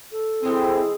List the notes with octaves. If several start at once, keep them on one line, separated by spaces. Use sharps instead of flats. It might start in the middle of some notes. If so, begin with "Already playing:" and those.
A4
E3 G#3 C4 E4 G#4